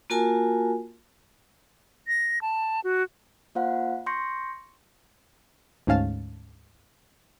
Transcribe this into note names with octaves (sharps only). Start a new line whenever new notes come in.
A#3 F4 F#4 A#4 G#5 A5
A#6
A5
F#4
A#3 F4 C5 F5 F#5
C6 C#6 G6 A#6 C#7
D2 G#2 C#4 F5 A5